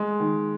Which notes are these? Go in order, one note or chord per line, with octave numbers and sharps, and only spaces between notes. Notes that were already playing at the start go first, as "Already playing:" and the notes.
Already playing: G#3
D#3